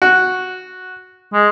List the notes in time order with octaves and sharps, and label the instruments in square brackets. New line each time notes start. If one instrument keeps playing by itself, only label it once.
[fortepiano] F#4
[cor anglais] G#3